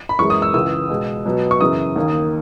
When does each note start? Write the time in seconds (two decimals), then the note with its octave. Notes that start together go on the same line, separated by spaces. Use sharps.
0.09 B5
0.19 F#2 E3 G#3 C#6
0.30 D#6
0.42 E6
0.54 C#2 C#3 E3 E6
0.90 B2 G#3 B3
1.25 B2 F#3 B3
1.51 C#6
1.61 F#2 C#3 E3 D#6
1.96 D#2 D#3 A#3